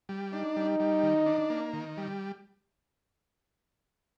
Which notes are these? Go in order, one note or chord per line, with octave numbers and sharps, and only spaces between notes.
G3
D4 D#4
G3
G3
D#3
D4
A#3
D#3
G3